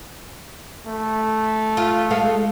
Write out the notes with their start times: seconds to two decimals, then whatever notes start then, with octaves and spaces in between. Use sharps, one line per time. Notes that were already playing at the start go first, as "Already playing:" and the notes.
0.87 A3
1.77 F4
2.11 G#3 A4 F5